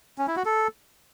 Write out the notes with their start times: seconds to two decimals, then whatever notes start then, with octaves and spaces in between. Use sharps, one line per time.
0.18 C#4
0.27 E4
0.36 F#4
0.45 A4